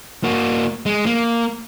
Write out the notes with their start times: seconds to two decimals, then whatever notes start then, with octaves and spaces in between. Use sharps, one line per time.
0.24 A#3 F#4
0.86 G#3
1.06 A#3